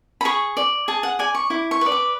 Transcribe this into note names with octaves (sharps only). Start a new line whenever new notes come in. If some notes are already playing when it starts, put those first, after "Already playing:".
B5
G#4 C#6
D5
G#4 A5
F#5
D5 G#5
C#6
E4 D6
C#6
B4 D5
D6